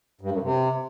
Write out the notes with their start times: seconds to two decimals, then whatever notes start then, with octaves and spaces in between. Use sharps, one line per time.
0.21 G2
0.31 F#2
0.42 C3